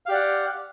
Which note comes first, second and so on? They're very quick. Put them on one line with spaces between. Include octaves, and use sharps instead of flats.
F5 G4 D5 F#5